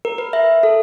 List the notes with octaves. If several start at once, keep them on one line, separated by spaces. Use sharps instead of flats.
A#4
B4
E5
A4